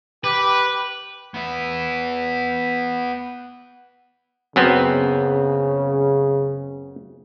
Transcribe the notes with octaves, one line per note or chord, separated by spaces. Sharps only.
G4 B4 D6
B3 E4
F#2 C#3 B3 C4